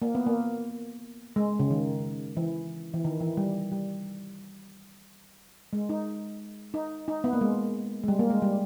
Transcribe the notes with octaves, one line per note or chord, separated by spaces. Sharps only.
A#3
B3
A#3
G#3
C#3
D#3
E3
E3
D#3
E3
G3
G3
G#3
D#4
D#4
D#4
B3
A#3
G#3
G#3
G3
A#3
G#3
G3